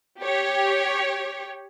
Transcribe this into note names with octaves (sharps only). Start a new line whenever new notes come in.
G4 C#5